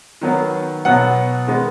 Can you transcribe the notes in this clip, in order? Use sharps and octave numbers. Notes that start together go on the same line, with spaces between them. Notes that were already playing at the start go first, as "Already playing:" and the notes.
D#3 F#3 B3
B2 F#3 B3 F#5
D#3 G#3 B3